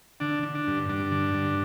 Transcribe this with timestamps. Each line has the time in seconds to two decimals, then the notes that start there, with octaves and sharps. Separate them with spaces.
0.20 D3 D4
0.43 D3
0.55 D4
0.67 G2
0.89 G2 D4
1.12 D3
1.34 G2